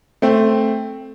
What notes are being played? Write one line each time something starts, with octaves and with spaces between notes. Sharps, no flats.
A3 C4